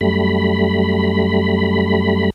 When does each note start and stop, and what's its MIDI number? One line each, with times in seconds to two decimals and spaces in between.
0.01 2.30 42
0.01 2.30 55
0.01 2.30 57
0.01 2.30 83